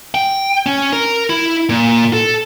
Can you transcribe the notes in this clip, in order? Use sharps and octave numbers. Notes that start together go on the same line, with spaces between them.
G5
C#4
A#4
E4
A#2
A4